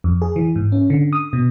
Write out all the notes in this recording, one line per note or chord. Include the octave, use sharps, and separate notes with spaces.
F2
G#4
E3
G#2
C#4
D3
D#6
B2